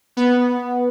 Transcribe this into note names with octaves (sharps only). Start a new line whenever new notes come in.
B3